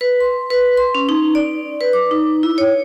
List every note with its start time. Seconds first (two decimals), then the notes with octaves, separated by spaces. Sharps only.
0.01 B4
0.20 C6
0.50 B4
0.77 C6
0.95 C#4
1.09 D#4
1.35 D5
1.81 B4
1.93 D6
2.11 D#4
2.43 E4
2.58 C#5